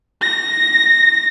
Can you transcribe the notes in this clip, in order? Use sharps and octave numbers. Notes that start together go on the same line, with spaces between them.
A#6